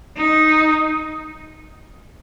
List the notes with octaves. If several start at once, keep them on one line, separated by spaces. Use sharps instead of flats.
D#4